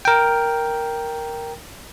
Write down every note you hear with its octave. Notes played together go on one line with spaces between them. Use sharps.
A#4 G5